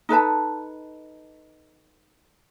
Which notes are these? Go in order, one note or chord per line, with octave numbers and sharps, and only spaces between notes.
D#4 A4 B4 A5